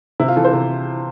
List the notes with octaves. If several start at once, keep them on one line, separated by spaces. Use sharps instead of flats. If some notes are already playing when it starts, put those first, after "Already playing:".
C3 E4
F4
E3 A4
C5
C3